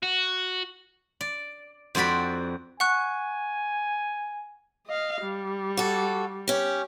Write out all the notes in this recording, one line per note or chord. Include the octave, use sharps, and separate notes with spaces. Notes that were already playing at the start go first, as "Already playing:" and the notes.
F#4
D5
F2 C4 F#4 D5 B5
F#5 G#5 C#6 F#6
D#5 F5
G3
F#4 A4
C#4 G4